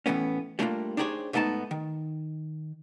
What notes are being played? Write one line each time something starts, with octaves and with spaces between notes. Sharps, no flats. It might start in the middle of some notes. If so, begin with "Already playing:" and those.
A2 E3 A3 B3 C#4
G3 A3 A#3 D4 D#4 F4
D4 D#4 G4 G#4 C5 C#5
G#2 A3 B3 D#4 A#4 A5
D#3